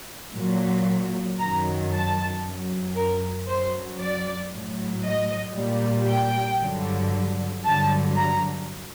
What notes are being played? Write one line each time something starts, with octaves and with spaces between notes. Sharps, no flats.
A#2 F#3
F#2 D#3 F#3 A#5
A5
F#2 F#3
A#4
F#2 F#3 C5
D5
A2 F#3
D#5
A#2 G3
G5
G2 D3 F#3
G2 D3 F#3 A5
A#5